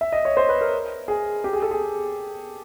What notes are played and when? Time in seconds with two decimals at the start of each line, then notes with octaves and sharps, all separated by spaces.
0.01 E5
0.12 D#5
0.25 C#5
0.37 C5
0.49 B4
0.61 A#4
1.08 G#4
1.44 G4
1.53 G#4
1.62 A4
1.71 G#4